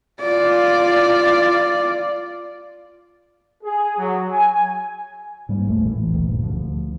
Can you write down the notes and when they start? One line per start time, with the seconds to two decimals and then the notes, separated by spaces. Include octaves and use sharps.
0.21 F4 D5
3.64 G#4
3.98 F#3
4.32 G#5
5.49 G#2 G3 A#3
5.67 A#1 E2 A3
5.84 E1 A1 E3
6.13 D#1 D2 G2 A#2
6.42 D2 F3